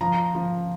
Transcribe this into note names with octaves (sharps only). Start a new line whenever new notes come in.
F3 A#5
F3